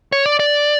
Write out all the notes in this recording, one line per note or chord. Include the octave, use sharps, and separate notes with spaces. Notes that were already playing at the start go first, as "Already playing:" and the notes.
C#5
D5
D5